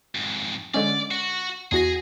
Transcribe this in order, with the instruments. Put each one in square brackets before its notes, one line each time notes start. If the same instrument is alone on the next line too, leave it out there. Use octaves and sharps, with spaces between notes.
[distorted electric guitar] F2 G#2
[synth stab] D3 G#3 C#4 [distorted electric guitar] D5
[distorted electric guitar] F#4
[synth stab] E2 F#4 A#6 [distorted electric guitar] G#4